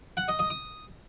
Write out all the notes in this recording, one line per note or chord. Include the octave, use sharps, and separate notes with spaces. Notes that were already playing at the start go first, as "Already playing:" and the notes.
F#5
D#5
D#5
D#6